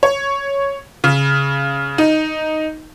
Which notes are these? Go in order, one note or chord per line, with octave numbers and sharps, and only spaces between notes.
C#5
C#3
D#4